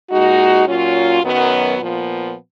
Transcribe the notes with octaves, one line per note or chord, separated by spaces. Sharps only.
A#2 G#3 D#4 F#4
A#2 F#3 C#4 F4
F#2 D#3 F#3 B3
A#2 F3 B3